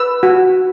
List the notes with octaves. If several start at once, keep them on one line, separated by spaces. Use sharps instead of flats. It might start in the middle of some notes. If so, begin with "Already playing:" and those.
Already playing: B4 E6
F#4